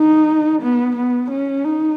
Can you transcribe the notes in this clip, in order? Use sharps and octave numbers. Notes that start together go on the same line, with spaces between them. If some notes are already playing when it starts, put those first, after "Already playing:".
Already playing: D#4
B3
B3
C#4
D#4